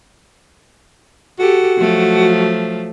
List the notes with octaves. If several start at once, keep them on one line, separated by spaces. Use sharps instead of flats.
F#4 G4 A4
F3 F#3 A3